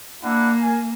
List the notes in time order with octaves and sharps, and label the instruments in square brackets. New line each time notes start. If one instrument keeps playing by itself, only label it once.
[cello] A#3 [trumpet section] D4 E4 F#5
[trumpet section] A#4 G#5